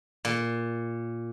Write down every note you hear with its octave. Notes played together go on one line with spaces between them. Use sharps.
A#2